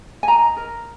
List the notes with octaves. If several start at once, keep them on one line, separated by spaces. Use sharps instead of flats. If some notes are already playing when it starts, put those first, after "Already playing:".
G#5
D#4 A#5
A#4